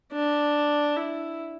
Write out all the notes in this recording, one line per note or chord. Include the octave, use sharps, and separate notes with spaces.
D4
E4